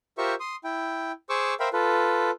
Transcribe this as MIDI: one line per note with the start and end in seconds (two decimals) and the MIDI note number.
0.18 0.34 65
0.18 0.34 67
0.18 0.34 70
0.18 0.34 72
0.18 0.34 76
0.18 0.34 85
0.40 0.56 84
0.40 0.56 87
0.64 1.12 64
0.64 1.12 79
1.29 1.54 68
1.29 1.54 72
1.29 1.54 85
1.29 1.54 86
1.29 1.54 88
1.60 1.69 70
1.60 1.69 72
1.60 1.69 76
1.60 1.69 77
1.60 1.69 79
1.60 1.69 83
1.73 2.31 65
1.73 2.31 69
1.73 2.31 71